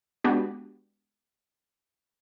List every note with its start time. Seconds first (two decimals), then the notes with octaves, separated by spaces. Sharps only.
0.24 G#3 B3 D4 F#4 G4